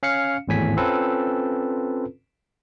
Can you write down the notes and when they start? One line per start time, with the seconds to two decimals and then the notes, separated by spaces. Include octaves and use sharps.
0.03 C#4 F5 F6 C#7
0.48 G#1 E2 A2 G#5 B6
0.77 C4 C#4 F4 A4 B4